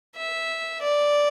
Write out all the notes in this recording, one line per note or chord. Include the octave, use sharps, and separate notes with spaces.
E5
D5